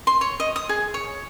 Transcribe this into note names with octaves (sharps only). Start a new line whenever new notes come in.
C6
C#5
D#5
D#6
G#4
C#5